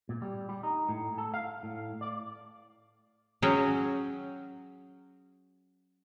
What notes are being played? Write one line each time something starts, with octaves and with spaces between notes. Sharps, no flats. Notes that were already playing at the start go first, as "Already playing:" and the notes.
A#2
G3
G3
D#4
A2
A4
F5
A2
D5
F#3 C#4 F#4 G#4 G5